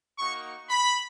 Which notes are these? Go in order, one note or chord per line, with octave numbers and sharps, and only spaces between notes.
A#3 D#4 F#4 C#6
B5